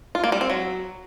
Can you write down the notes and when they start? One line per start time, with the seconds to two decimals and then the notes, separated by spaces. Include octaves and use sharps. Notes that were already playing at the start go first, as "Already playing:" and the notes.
0.15 F4
0.24 A#3
0.32 G3
0.41 C4
0.50 F#3